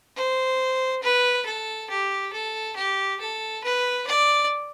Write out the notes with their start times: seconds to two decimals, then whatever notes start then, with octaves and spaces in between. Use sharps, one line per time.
0.16 C5
1.02 B4
1.46 A4
1.90 G4
2.33 A4
2.76 G4
3.20 A4
3.63 B4
4.06 D5